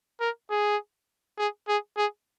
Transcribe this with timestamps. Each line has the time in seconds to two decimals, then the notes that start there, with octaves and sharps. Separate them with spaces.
0.20 A#4
0.50 G#4
1.38 G#4
1.68 G#4
1.97 G#4